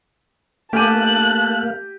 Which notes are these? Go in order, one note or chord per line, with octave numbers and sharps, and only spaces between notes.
A3 A#3 G4 F5 G#5 A5 F#6 D#7